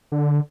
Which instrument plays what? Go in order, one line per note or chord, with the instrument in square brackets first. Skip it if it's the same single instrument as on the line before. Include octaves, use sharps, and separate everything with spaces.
[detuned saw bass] D3